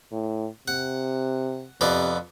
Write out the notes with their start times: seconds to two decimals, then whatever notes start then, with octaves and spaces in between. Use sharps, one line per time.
0.12 A2
0.68 C3 F#5
1.81 F2 C3 B3 D5